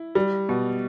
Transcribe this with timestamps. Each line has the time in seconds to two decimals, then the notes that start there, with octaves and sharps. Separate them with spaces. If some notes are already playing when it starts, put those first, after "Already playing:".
Already playing: E4
0.15 G3
0.49 B2